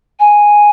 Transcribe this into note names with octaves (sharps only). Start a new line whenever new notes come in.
G#5